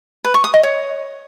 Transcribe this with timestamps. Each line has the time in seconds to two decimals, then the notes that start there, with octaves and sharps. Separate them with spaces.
0.24 B4
0.34 C#6
0.44 D#6
0.54 D#5
0.63 C#5